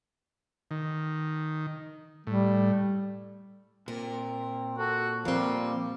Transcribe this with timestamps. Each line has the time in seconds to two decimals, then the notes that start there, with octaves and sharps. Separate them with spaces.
0.71 D#3
2.27 A2 G3
3.88 A#2 C4 A#4
4.78 F#4 A4
5.25 F3 G3 A#3 C4